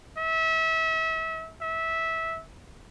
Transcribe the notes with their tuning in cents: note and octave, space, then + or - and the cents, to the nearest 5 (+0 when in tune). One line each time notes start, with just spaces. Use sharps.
E5 -30
E5 -15